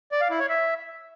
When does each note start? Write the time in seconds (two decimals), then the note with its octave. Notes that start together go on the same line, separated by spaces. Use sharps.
0.12 D5
0.21 F5
0.30 E4
0.40 C#5
0.49 E5